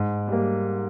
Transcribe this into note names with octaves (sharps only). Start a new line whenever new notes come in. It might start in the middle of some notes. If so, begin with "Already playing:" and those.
Already playing: G#2
G3 A#3